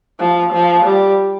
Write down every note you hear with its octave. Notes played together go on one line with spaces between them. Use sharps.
F3
F3
G3